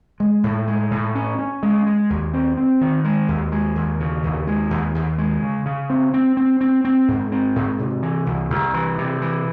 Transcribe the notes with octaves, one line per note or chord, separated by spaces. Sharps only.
G#3
A2
G#3
A2
C#4
C#4
G#3
G#3
D#2
C4
C4
D#3
G#3
D#2
G#3
D#2
C#3
D#2
G#3
D#2
D#2
G#3
C#3
C#3
C4
C4
C4
C4
C4
G#2
C4
G#2
C3
E3
C2
C2
E3
C3
E3